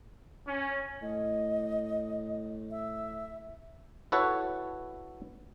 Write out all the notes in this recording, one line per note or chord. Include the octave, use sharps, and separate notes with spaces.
C#4
A2 D#5
E5
E4 F#4 A4 B4 C#5